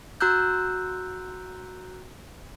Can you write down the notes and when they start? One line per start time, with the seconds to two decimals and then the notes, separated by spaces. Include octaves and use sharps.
0.21 F#4 A#5 E6 F#6 G6